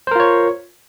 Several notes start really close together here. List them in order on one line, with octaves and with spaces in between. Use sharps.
C5 A#4 F4 C#5